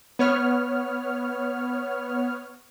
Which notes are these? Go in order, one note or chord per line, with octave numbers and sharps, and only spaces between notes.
B3 C#5 F6